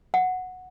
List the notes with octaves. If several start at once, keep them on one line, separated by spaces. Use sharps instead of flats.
F#5